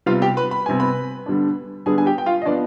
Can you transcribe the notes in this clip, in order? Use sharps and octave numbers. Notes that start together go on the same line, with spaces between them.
C3 G3 B3 F4 F5
G4 G5
B4 B5
B5
C3 G3 B3 G#5
B4 B5
D3 G3 B3 D4
D3 G3 B3 D4 G#4 G#5
G#5
G4 G5
G5
F4 F5
D#5
F3 B3 D4 D5